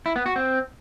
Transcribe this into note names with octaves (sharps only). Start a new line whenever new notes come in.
E4
B3
F#4
C4